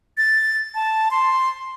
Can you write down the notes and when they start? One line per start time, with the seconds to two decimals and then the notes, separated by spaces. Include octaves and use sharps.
0.18 A6
0.75 A5
1.11 C6